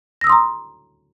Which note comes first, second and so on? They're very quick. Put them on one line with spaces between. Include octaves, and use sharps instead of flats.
A#6 E6 D#6 C6 A#5